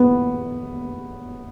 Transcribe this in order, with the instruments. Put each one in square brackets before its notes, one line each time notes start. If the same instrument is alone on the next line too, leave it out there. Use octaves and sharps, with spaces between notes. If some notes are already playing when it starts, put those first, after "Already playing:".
Already playing: [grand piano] B3